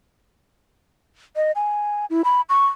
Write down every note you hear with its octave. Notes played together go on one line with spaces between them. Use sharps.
D#5
G#5
E4
B5
C#6